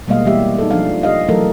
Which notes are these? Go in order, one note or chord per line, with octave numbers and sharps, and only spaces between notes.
B2 G3 G#3 A#3 D#5 F5
E3 G3 A#3 G4 E5
D#4 G#4 A4
F3 D4 F5
G4 D#5 F5
E3 F#3 A3 A4 A#4